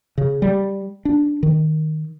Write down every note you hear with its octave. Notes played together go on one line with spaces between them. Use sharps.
C#3
G3
D4
D#3